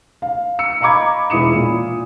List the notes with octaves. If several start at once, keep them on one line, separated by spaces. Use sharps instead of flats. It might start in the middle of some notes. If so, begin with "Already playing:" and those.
F5
E6 C#7
D#5 F5 A#5 B5 D6 G#6
E1 E4 B5 D#6 C#7 E7
A#2